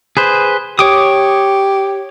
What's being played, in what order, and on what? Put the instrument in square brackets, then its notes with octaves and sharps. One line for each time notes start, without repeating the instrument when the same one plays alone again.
[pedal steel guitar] G#4 B4 C5
[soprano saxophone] G4 [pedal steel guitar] C#5 D6 D#6